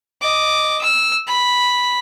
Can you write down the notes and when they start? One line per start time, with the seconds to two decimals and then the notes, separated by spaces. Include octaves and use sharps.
0.21 D#5 D6
0.81 E6 F6
1.27 B5